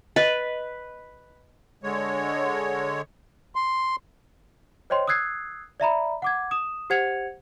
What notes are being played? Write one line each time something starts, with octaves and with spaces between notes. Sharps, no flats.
B4 D#5
D3 G#3 C#5
C6
C5 C#5 D#5 G5 C6
D#6 E6 F#6 G#6 C7
D5 E5 A#5 B5
F#5 D6 G#6
D#6 E7
G4 C5 F#5 G#6 C#7 F7